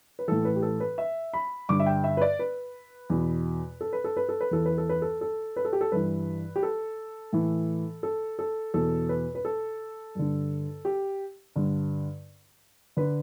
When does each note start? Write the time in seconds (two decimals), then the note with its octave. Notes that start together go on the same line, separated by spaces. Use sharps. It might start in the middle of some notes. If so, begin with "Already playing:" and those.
0.19 B4
0.28 A2 E3 A4
0.45 B4
0.56 G4
0.62 A4
0.80 B4
0.98 E5
1.34 B5
1.69 G2 D3 D6
1.80 E5
1.86 G5
2.04 E5
2.17 B4
2.21 D5
2.39 B4
3.10 E2 B2
3.81 A4
3.93 B4
4.04 A4
4.17 B4
4.29 A4
4.41 B4
4.51 E2 E3 A4
4.65 B4
4.78 A4
4.89 B4
5.02 A4
5.21 A4
5.56 B4
5.65 A4
5.73 G4
5.81 A4
5.92 G2 E3 B4
6.56 G4
6.63 A4
7.33 A2 E3
8.03 A4
8.39 A4
8.74 E2 B2 A4
9.09 B4
9.35 B4
9.45 A4
10.15 G2 D3
10.85 G4
11.56 G2 D3
12.97 D3 B4